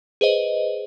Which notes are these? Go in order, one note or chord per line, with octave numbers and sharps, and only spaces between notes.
G#4 B4 C5 D#5